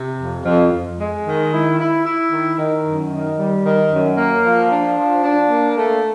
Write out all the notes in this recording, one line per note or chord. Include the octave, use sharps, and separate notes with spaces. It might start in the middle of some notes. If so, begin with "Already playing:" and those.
Already playing: C3
F2
F2
F2
G#3
D#3
E4
E4
E4
D#3
D#3
F#2
D#3
G3
D#3
F#2
A#3
F3
D4
F3
D4
A#3
A3